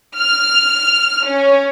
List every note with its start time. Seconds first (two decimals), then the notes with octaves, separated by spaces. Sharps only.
0.16 F6
1.26 C#4